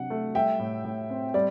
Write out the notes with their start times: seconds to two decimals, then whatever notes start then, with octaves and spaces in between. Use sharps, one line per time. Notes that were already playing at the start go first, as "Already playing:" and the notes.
Already playing: C3 F#3 D4 F#5
0.10 A3
0.35 G3 E5 G5
0.59 A2
0.84 A2
1.10 C4
1.34 G3 D5